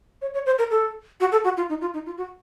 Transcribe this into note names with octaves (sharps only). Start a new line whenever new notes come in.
C#5
C#5
C5
A#4
A4
F#4
A4
F#4
F4
D#4
F4
D#4
F4
F#4